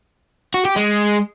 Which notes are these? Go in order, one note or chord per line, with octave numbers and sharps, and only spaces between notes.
F#4
G4
G#3